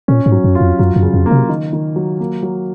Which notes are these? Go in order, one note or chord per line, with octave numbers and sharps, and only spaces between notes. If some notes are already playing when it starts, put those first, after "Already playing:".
A#2 C#4
G#2
F#3
F#2
F4
F2
F#2 F#3
F#2
C#3
F2
A#3
C3
D#3
D#3
F#3
A#3
F#3